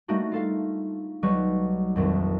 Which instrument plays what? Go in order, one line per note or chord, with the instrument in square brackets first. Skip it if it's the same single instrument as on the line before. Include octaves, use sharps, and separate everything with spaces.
[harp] G3 A3 A#3 D4 D#4 F#4
F4 A4 F5
B1 F#3 G3 B4 C#6
D#1 A#1 F2